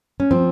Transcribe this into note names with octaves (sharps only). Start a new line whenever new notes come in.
C#4
F3 C4